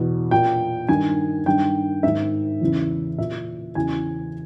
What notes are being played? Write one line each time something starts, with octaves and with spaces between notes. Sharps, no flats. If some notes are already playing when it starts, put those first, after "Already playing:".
Already playing: E2 B2
A#2 G5
G2 D#3 G#5
G2 D#3 G5
G#2 D#3 E5
E2 C#3 E3
A#2 E5
E2 C#3 E3 G#5